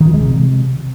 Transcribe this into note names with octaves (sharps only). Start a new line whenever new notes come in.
D#3
F3
G#3
C3